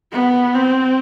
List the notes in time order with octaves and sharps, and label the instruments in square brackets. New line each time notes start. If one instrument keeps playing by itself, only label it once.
[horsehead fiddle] B3
C4